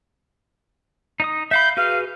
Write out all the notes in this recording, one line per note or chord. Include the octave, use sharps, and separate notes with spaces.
D#4 D#5 D#6
E5 F5 B5 G6
F#4 G#4 B4 F5